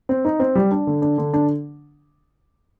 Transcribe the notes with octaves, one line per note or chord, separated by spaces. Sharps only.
C4
D#4
C4
G3
D4
D3
D4
D3
D4